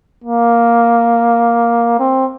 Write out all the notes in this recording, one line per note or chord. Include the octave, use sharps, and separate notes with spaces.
A#3
C4